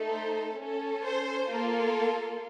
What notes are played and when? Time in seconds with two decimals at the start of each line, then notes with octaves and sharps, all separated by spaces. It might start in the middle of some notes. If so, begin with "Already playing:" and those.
Already playing: A3 D#4 A4
0.10 C5
0.56 C#4 A4
1.03 C5
1.49 A#3 F4 A4